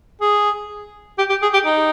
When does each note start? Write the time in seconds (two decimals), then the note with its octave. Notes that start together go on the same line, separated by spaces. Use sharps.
0.21 G#4
1.18 G4
1.30 G4
1.42 G#4
1.53 G4
1.65 D#4